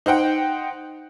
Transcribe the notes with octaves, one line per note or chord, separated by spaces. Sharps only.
D#4 C5 F#5 G5